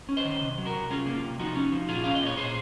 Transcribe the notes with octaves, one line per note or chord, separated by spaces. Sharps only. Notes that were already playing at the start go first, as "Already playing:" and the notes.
C#4
C5 D#5
D#3
C3
F#3
F#4 A#4
C3
C#4 F4 G#4
A#3
F4
C3
F3 D#4 F#4
C#4
F3
A#2 F4 G#4
C#4 F5
D#5
A#2
C#5
A#2 G#4 C5